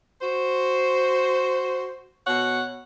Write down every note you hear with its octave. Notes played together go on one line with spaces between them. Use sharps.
F#4 C5
B2 C#5 F#5